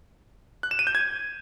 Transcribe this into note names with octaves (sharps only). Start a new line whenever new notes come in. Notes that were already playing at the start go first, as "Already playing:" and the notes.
F#6
E7
D#7
G6
G#6